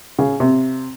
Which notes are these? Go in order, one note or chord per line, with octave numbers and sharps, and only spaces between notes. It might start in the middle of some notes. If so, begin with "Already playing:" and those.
C#3
C3